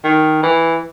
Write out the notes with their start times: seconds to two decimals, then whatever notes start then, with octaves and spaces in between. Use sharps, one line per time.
0.04 D#3
0.43 E3